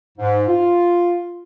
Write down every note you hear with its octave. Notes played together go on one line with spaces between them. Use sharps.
G#2
F4